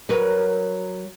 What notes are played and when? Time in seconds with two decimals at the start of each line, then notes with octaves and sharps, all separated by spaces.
0.09 F#3 A#4 B4